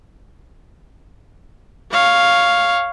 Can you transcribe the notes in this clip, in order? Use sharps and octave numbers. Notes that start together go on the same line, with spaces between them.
C#5 F5